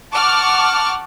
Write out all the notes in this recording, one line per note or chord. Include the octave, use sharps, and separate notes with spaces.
F#5 A5 C#6 D6 F6